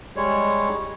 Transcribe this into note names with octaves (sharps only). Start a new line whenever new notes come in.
G3 G#3 C#5